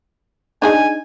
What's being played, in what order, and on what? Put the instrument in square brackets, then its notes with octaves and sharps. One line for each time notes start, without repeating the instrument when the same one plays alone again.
[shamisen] D4 D#4 G#4 [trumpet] G#5